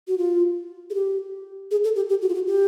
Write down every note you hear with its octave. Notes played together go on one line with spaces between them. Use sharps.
F#4
F4
G#4
G4
G#4
A4
G4
G4
F#4
F4
F#4
G4